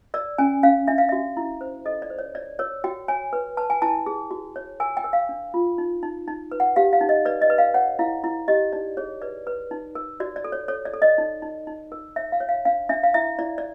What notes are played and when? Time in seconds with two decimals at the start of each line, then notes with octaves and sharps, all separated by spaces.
0.14 A#4 D5
0.38 C#4 G#5
0.63 C#4 F5
0.88 D4 E5
0.98 F5
1.09 F#4 E5
1.37 E4
1.61 C5
1.85 A4 D#5
2.02 D5
2.10 C5
2.19 C#5
2.35 C#5 D5
2.59 A#4 C#5
2.84 F#4 G5
3.08 C#5 G#5
3.33 B4
3.57 B4 A5
3.70 G#5
3.82 E4 A5
4.06 G#4
4.31 F#4
4.56 C#5
4.80 A#4 G#5
4.97 G5
5.04 A#4
5.13 F5
5.29 D4
5.54 F4
5.78 D#4
6.03 D#4
6.28 D#4
6.52 B4
6.60 F#5
6.76 G4 F5
6.93 F5
7.01 D#4
7.09 D#5
7.25 B4 D5
7.42 D#5
7.50 B4
7.58 F5
7.74 C#5 F#5
7.99 E4 F5
8.24 E4
8.48 G4 D#5
8.73 D#4 D5
8.97 G#4 C#5
9.22 B4 D5
9.47 B4
9.71 D#4
9.95 A#4
10.20 F#4 D5
10.36 D5
10.44 A4
10.52 C#5
10.68 A4 C#5
10.85 D5
10.94 A4
11.02 D#5
11.18 D#4
11.42 D#4
11.67 D#4
11.92 A#4
12.16 C#5 E5
12.32 F5
12.40 C#5
12.49 F5
12.65 D4 F5
12.89 D4 E5
13.03 F5
13.14 E4 E5
13.39 E4 D5
13.58 D5